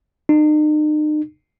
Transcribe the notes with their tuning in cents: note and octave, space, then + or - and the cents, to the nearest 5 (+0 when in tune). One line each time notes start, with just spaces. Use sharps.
D#4 -40